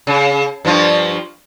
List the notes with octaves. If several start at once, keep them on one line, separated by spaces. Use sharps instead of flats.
C#3
G2 F3 F4